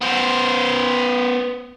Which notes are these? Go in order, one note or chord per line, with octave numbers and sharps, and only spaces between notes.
B3 C5